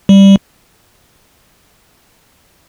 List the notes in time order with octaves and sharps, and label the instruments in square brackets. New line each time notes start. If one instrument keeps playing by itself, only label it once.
[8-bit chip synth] G3